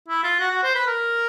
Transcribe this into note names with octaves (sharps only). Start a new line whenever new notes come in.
E4
F4
F#4
F#4
C5
B4
A#4